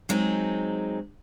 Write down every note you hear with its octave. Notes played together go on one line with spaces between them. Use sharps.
F#3 G#3 C4 D#4